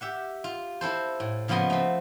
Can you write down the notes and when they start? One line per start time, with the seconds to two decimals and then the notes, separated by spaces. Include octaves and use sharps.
0.01 G4 E5 F#5
0.44 F4
0.81 C4 E4 A4 C5
1.20 A2
1.48 C#3 F3 A#3 B3 D#5 C6
1.70 A3 C4